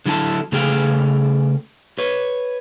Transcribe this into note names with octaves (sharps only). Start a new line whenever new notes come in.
D3 F#3 E4 A4 A5
C#3 A3 G#4 A4 F5 G5
B4 C#5